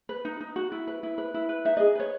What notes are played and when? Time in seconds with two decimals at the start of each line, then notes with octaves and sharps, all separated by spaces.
0.09 B4
0.25 D#4
0.41 D#4
0.56 F#4
0.72 E4
0.87 B4
1.03 E4
1.18 B4
1.34 E4
1.49 B4
1.65 D#4 E5
1.77 G#4 D#5
1.95 B4 C#5